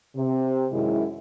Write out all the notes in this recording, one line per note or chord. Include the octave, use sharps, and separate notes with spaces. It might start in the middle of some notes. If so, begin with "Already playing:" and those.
C3
F#2 D#3 G#3 E4